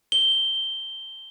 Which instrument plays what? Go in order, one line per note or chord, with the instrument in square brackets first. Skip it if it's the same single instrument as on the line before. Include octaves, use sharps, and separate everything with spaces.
[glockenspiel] G7